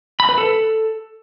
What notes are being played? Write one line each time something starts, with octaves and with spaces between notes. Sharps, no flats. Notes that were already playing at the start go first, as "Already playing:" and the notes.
B5
B4
A4